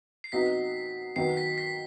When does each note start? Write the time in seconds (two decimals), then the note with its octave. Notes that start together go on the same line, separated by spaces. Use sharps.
0.24 C7
0.32 C3 F#3 B3 D#4 F#4 B6
1.16 D#3 F#3 B3 C7
1.37 B6
1.58 B6